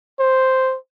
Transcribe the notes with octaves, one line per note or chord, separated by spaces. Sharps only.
C5